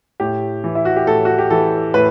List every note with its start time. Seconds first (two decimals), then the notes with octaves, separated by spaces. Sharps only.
0.20 A2 G4
0.64 E3
0.75 E4
0.85 F#4
0.96 G4
1.07 A2 A4
1.25 F#4
1.38 G4
1.50 E3 A4
1.94 A2 B4